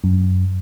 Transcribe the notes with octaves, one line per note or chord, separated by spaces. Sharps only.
F#2